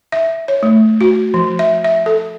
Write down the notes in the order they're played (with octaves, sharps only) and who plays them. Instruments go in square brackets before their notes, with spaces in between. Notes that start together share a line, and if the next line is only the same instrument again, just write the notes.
[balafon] E5
C#5
A3
F#4
F3
E5
E5
A4